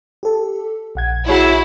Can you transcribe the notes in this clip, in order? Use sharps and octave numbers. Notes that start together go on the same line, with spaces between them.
G4 A4
A#1 F#5 G#6
E4 F#4 G#4 C#5